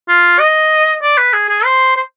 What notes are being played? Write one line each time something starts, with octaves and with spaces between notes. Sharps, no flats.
F4
D#5
D5
B4
G#4
G#4
C5
C5